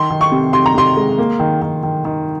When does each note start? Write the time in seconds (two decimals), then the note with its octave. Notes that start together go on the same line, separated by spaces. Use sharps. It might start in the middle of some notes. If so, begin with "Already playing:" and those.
Already playing: D#3 C6
0.10 D#3
0.21 C#6
0.32 C3
0.53 C3 C6
0.66 A#5
0.75 C3 C6
0.97 G#3
1.19 A#3
1.40 D#3
1.62 D#3
1.83 D#3
2.05 D#3